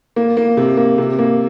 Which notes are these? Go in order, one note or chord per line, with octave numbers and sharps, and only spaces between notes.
A#3
A#3
C3
A#3
C3
A#3